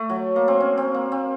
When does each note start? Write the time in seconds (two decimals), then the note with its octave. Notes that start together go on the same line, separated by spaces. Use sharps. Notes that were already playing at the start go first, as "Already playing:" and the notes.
Already playing: A3
0.10 F#3
0.36 A#3
0.48 C4
0.60 C#4
0.78 C4
0.95 A#3
1.12 C4